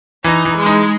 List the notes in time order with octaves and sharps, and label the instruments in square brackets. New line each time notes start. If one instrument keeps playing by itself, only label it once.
[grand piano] E3 [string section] D#4
[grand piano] E3
[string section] G#3
[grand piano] D#4